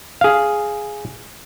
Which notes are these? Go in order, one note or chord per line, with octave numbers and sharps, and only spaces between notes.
G#4 F5